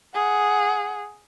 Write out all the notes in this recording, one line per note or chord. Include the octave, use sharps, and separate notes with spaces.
G#4 F#5